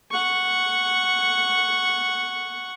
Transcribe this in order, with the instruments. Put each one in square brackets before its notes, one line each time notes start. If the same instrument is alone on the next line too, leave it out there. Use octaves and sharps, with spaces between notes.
[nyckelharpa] F#5 C#6